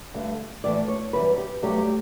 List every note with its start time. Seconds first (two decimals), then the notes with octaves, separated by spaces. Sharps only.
0.14 G2 D3 A3
0.64 A2 E3 A3 D5
0.88 C#5
1.13 F#2 E3 G3 B4
1.38 G4
1.62 G2 F#3 A3 G4